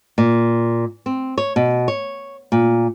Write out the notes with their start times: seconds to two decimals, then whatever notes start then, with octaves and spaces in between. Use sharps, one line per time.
0.18 A#2
1.06 C4
1.38 C#5
1.56 B2
1.88 C#5
2.52 A#2